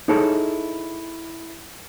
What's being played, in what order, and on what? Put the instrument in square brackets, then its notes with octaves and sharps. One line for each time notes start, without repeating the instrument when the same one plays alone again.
[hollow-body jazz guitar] D#4 E4 G#4 A4 C#5 D#5